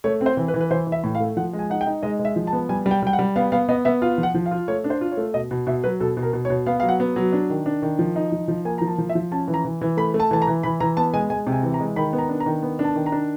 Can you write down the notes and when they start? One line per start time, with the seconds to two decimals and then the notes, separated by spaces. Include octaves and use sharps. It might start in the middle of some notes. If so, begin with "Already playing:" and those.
0.04 A3 C#5
0.21 C4
0.26 C5
0.37 E3
0.48 B4
0.54 E3
0.61 B4
0.70 E3 C5
0.87 E3
0.92 E5
1.04 A2
1.15 F5
1.20 A3
1.37 F3 F#5
1.53 G#3
1.59 G#5
1.70 D#4 F#5
1.81 G5
1.86 D#4
2.03 G#3 D#5
2.19 G#3
2.25 E5
2.36 F3
2.47 A5
2.53 B3
2.69 G3 G#5
2.86 G3
2.91 G5
3.02 G3 G5
3.13 F#5
3.19 G3
3.36 B3 F5
3.52 B3 F5
3.69 B3 D#5
3.85 B3 E5
4.02 F4 F5
4.18 F3
4.23 F#5
4.35 F3
4.46 F5
4.51 F4
4.68 A3 C#5
4.84 D4
4.90 C5
5.01 F4
5.12 C#5
5.17 A3
5.34 B2 D#5
5.51 B2
5.67 B2 E5
5.84 F#3 B4
6.00 B2 A4
6.17 B2
6.23 A#4
6.33 B2
6.45 C#5
6.50 B2
6.66 B3 F5
6.80 F#3 F5
6.89 F#5
7.00 B3
7.16 F#3
7.33 D4
7.50 D#3
7.66 D4
7.82 D#3
7.99 F3
8.16 D#4
8.32 F3
8.48 F3
8.65 A#3 G#5
8.78 F3 A#5
8.87 A5
8.98 F3
9.09 E5
9.15 F3
9.31 C#4 A5
9.48 E3
9.54 A#5
9.65 E3
9.82 E3
9.97 A3 B5
10.14 A3
10.20 A5
10.31 E3 A5
10.42 A#5
10.47 E3
10.63 E3 B5
10.80 E3 A#5
10.97 B3 A5
11.14 G#3 G#5
11.30 G#3 G#5
11.47 C3
11.52 G#5
11.63 E3
11.74 A#5
11.80 G#3
11.96 D#3 B5
12.13 B3
12.18 A#5
12.29 D4
12.40 A#5
12.46 D#3
12.63 B3
12.79 D4
12.85 A5
12.95 D#3
13.06 A#5
13.12 D4